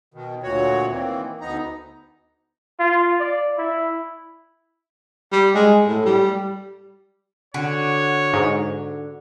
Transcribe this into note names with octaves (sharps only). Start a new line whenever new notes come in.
B2 D#3
D2 A#2 F#4 C#5
D#3 E3 A#3 C4
D2 B3 D#4 A#5
F4
D5
E4
G3
G#3
A2
G3
D3 F#4 C#5
G#2